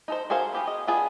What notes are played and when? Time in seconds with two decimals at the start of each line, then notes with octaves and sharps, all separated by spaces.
0.08 D#4 A4 C5
0.30 F#4 G#4 A#4 C5 F5
0.53 B3 G4 G#4
0.67 D#5
0.87 B3 D4 F4 G#4